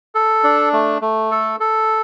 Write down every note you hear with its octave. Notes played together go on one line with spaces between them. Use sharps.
A4
D4
A3
A3
A4
A4